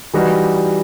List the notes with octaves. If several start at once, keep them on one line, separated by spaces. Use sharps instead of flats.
E3 G3 D#4 F#4